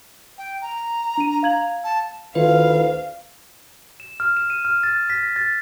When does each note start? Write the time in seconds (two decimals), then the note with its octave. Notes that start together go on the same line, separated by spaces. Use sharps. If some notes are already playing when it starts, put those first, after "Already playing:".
0.38 G5
0.62 A#5
1.17 D4 D#7
1.43 F5 G#6 F#7
1.84 A5
2.35 D2 D#3 E4 F4 B4 F5
4.00 E7
4.20 F6
4.37 E7
4.50 D#7
4.65 F6
4.83 A6
5.10 B6
5.23 A#6
5.36 A6